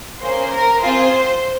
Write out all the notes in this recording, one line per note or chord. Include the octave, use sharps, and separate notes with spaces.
A#3 C#4 G#4 C5
A#4
C4 F4 G#4 C5